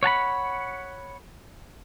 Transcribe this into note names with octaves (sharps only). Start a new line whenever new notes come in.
C#5 F#5 A5 B5